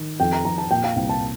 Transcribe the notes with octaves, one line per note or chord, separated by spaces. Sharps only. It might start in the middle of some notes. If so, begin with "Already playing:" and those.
Already playing: D#3
F2 G5
A#5
F2 A#5
A5
A#2 G5
F5
C2 G5
A5